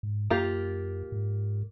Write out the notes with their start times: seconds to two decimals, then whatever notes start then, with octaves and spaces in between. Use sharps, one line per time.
0.03 G#2
0.30 F#2 A#3 F4 G4
1.12 G#2